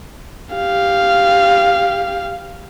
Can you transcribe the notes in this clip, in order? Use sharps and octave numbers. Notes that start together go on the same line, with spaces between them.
G4 F5